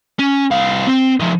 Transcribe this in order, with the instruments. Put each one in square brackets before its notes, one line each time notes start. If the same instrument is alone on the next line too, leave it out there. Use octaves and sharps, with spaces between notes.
[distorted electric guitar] C#4
C2 F5
C4
F3 D#4